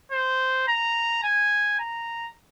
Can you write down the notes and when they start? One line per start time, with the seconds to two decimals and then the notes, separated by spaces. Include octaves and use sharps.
0.12 C5
0.68 A#5
1.23 G#5
1.79 A#5